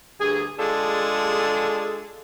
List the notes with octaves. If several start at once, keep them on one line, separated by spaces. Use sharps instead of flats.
D2 G2 G#4
G#3 D4 F4 G#4 A4